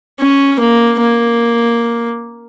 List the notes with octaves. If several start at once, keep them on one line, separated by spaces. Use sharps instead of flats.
C#4
A#3
A#3